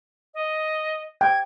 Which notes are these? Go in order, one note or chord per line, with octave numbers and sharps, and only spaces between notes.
D#5
G5 G#6